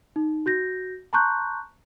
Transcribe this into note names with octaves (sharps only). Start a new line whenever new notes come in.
D#4
F#4 G6 A#6
A5 A#5 C6 C#6 F#6 G6